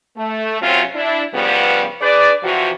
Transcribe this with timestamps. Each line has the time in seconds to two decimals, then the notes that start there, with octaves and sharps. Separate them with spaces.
0.17 A3
0.62 F#2 C3 F#3 C4 C#4 F4
0.95 D4 E4
1.34 G2 C#3 F3 G3 B3
2.02 D4 G#4 B4 D5
2.43 C3 E3 F3 F#4